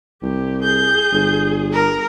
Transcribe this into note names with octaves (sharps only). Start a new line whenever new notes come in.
C2 G4
G#4 G6
G1
A#4